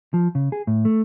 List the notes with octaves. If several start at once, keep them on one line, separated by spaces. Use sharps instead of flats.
F3
C#3
G#4
A2
A3